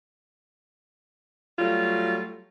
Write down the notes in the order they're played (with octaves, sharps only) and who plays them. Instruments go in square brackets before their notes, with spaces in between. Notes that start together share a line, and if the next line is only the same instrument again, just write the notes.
[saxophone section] F#3 G3 A3 F4